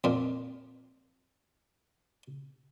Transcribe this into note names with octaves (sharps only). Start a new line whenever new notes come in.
F2 A#2